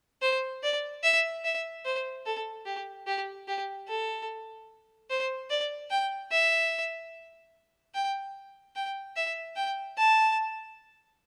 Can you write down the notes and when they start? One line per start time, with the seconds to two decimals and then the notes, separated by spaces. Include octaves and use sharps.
0.22 C5
0.63 D5
1.03 E5
1.44 E5
1.85 C5
2.26 A4
2.66 G4
3.07 G4
3.48 G4
3.88 A4
5.10 C5
5.50 D5
5.90 G5
6.32 E5
7.95 G5
8.76 G5
9.16 E5
9.56 G5
9.98 A5